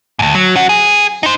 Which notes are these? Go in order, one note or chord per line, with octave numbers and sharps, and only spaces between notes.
D2 G#2
F#3
C#4 F#4
G#4
D#4 C5